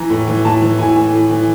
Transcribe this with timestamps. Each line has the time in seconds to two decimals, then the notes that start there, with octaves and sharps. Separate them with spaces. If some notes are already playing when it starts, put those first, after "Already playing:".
Already playing: E3 A#5
0.10 A2
0.27 E3
0.45 A2 A5
0.62 E3
0.79 A2 G#5
0.96 E3
1.13 A2
1.31 E3